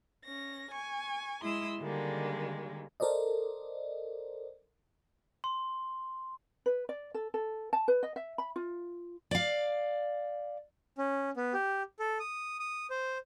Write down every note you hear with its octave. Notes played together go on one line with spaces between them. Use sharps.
C#4 A#6
G#5 C#6
G#3 E4 C6 D#6 E6
D3 D#3 G3 G#3 A#3
A4 A#4 C5 D5 D#5
C6
B4
D5
A4
A4
A5
B4
D#5
E5
B5
F4
D5 F5
C#4
B3
G4
A4
D#6
D#6
C5